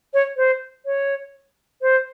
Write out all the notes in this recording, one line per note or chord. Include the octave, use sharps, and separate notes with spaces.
C#5
C5
C#5
C5